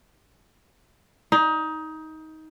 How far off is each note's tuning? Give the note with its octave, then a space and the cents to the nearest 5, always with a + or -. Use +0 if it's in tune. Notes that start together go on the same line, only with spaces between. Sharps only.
D#4 +20